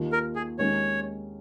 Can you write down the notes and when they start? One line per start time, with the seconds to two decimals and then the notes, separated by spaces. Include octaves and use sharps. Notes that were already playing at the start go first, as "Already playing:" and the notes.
Already playing: D#2 D#3 A#3 F4
0.12 A#4
0.35 G#4
0.58 D#2 D#3 G#3 C#4 C#5